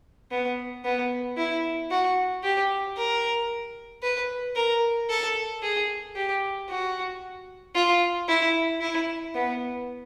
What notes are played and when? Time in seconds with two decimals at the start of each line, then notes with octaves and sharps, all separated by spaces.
0.31 B3
0.84 B3
1.37 E4
1.91 F#4
2.44 G4
2.97 A#4
4.03 B4
4.56 A#4
5.09 A4
5.63 G#4
6.16 G4
6.69 F#4
7.75 F4
8.28 E4
8.81 E4
9.34 B3